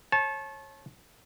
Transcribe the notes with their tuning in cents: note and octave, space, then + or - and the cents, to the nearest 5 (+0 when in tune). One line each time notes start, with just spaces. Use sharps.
C#5 -30 A5 -25